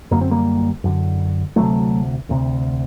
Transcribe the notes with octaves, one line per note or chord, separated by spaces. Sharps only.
F#2 D3 A#3
C4
G3 A#3
F#2 D3
D2 C3 F#3 A3
D2 C3